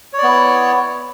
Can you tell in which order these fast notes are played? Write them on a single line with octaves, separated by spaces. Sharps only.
C#5 D5 B3 E4